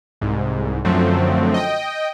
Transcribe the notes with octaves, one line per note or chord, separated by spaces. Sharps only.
C2 G#2
F#2 D3 F3 F#3 A3 C4
D#5 G5